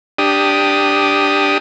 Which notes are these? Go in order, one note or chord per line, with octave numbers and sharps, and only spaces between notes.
D4 G4 D#6